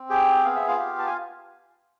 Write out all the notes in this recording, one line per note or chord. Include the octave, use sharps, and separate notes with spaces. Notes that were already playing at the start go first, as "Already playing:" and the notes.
Already playing: C4
G4 G#4 G5
B3 F5
E5
F4 F5
G4
A5
G#5